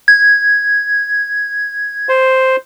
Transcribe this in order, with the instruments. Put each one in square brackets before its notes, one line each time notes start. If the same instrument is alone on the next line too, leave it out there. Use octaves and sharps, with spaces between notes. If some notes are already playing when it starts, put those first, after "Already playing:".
[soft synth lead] G#6
[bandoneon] C5